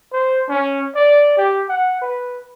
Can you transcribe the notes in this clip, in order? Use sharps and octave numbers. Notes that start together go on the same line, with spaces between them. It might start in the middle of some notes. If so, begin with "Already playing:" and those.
C5
C#4
D5
G4
F#5
B4